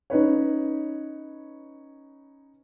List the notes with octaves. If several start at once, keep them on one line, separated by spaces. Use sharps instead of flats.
C#4 D#4 B4 C#5